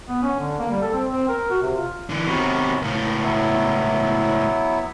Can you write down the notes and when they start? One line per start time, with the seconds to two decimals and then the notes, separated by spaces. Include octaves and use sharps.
0.09 B3
0.22 C#4
0.40 D3
0.59 A#3
0.70 G3
0.82 A4
0.93 C4
1.11 C4
1.29 A#4
1.50 F#4
1.62 C3
1.76 F4
2.09 D3 E3
2.26 F#2 C3 D#3 B3 F#4
2.82 C#2 A2 A#3
3.23 F#3 B3 E4